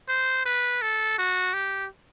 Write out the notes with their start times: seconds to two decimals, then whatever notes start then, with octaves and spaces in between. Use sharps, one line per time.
0.09 C5
0.46 B4
0.82 A4
1.18 F#4
1.54 G4